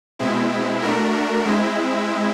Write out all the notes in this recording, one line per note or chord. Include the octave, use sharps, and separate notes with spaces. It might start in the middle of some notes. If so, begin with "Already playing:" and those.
B2 G#3 C4 E4
A3 D4 F#4 A#4
G#3 C4 E4